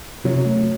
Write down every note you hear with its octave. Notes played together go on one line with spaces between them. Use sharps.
F#2 C3 F#3
A3